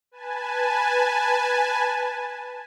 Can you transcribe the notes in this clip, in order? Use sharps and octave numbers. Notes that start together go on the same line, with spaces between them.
B4 G#5 A5